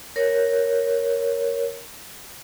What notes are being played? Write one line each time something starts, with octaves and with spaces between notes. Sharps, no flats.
A#4 C#5